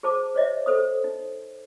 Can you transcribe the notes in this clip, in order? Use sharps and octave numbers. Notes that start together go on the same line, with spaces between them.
G#4 C5 A5 D6
C5 C#5 D#5 E5
A4 C5 D#6
D#4